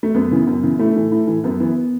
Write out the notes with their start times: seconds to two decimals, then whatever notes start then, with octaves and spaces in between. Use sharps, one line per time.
0.03 A3
0.15 F#2 B3
0.31 C#3 E3
0.47 F#2
0.63 C#3 E3
0.79 A2 A3
0.96 E3
1.12 A2
1.27 E3
1.44 F#2 B3
1.60 E3 B3